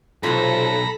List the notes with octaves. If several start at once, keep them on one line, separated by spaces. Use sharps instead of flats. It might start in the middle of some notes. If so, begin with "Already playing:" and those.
B1 C3 F4 A4 A#5 B5